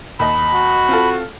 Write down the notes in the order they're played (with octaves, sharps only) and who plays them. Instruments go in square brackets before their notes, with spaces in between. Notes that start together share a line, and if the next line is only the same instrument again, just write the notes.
[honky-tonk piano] D#2 D#5 [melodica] B5
[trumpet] F#4
[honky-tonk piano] C4 F4 A4